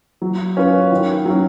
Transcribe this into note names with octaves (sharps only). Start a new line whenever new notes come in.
F#3
C#4 F4 B4
D#3
F#3 C#4